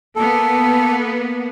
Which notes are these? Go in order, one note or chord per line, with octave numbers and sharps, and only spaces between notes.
A#3 B3 A4